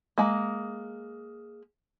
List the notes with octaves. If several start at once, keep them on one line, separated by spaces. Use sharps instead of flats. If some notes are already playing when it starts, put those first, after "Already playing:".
G#3 A#3